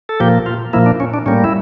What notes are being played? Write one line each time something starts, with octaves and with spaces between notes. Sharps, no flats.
A4
A#2 F3 A#3 G4
F4
A#2 F3 A#3 E4
D4
C#4
D4
A2 G3 A#3 C#4
E4